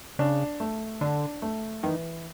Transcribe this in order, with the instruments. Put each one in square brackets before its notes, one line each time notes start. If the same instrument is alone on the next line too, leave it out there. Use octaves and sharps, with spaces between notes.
[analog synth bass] C#3 [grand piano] D4
[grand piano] A3
[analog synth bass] D3 [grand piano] D4
[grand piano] A3
[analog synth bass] D#3 [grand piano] E3